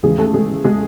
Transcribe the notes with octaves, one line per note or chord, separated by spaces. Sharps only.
D#2 C#3 E3 G#3 G#4
A3 A4
G#3 G#4
G#3 G#4